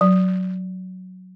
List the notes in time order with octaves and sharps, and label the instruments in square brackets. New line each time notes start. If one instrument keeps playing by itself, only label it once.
[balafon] F#3